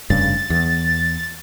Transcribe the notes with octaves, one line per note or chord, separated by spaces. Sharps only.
F1 G2 C#3 A6
E2